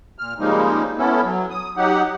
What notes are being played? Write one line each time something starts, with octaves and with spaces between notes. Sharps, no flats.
A#2 F6
C#3 F3 G3 G#3 A#3 D#4
B3 C#4 E4 A4
F#3
D#6
F#3 D#4 G4 F#5